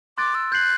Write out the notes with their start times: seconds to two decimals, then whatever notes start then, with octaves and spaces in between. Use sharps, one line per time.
0.18 C6 D6 F#6 A6 D7
0.35 E6
0.52 F#6 G6 C7 F#7